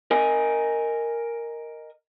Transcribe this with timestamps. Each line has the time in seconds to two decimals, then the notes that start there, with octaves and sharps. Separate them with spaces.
0.11 A#4 D#5 G#5